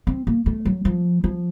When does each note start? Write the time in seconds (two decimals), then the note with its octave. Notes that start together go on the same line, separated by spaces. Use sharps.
0.07 C4
0.27 A#3
0.46 A3
0.65 F#3
0.85 F3
1.24 F3